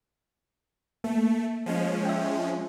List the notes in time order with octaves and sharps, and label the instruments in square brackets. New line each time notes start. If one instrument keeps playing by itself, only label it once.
[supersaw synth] A3 [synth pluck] A#3
[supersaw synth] F3 G#3 C#4
[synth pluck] E5 G5